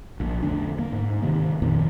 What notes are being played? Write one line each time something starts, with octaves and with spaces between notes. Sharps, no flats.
A#1 A#2
E2 D3 A3 D4
A#3
G#2
C3 D#3 A#3
F2 A#2 D#3